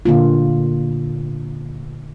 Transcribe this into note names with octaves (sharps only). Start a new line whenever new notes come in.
A#2 D3 A#3 F4